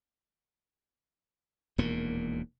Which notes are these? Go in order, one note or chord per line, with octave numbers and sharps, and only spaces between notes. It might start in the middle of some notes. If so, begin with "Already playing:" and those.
E1 D#2 A#2 A#3